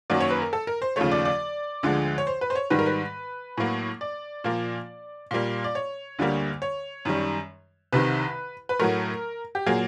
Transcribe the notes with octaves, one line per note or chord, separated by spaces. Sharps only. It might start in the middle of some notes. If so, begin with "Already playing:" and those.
F#2 D#3 F#3 A#3 D5
C#5
B4
A#4
A4
A#4
C5
D#2 C#3 F3 A3 C#5
D5
D5
D2 D3 F3 G#3
C#5
C5
B4
C5
C#5
G#2 D#3 G3 B4
A#4
B4
A2 F#3 A#3
D5
A#2 F3 A#3
A#2 G3 A#3
D5
C#5
D2 D3 G3 A#3
C#5
F#2 D#3 G3
C2 C3 D#3 B4
B4
A2 F#3 A3 A#4
G4
A#2 F#3 A#3 G#4